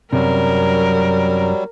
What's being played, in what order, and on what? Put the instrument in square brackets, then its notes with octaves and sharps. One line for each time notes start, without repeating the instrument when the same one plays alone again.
[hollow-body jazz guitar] F#2 C3 [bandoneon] F#3 G3 [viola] A#4